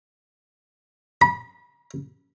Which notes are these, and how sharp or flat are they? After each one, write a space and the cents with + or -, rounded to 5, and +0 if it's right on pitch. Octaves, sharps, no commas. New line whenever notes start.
B5 -30